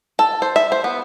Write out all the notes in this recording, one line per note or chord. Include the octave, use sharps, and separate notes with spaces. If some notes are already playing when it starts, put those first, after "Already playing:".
A4
C5
E5
C5
B3